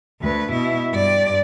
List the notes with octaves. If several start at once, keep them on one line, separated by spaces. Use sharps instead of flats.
D2 B4
B2 E4
G2 D5